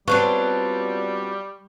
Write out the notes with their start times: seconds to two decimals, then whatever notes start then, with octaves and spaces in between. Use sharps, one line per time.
0.08 F#3 G3 B3 C4 D4 F4 C#6